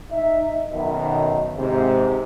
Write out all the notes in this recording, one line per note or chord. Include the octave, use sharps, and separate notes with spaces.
D#4 E5
B1 F#2 B2 D#3
G#2 C3